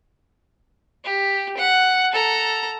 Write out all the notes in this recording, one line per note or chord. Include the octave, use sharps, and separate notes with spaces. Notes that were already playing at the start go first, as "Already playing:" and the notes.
G4
F#5
A4 A#5